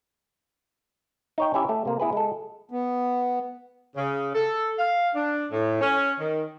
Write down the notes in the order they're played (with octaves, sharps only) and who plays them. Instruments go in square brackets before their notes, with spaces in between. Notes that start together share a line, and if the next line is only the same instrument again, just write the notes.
[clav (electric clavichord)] D#4 C#5 G5
C#4 E4 G4 E5
A3
C3 A#3
B3 E4 G#4 B4
G#3 A4
[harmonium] B3
[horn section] C#3
A4
F5
D4
A2
C#4
D#3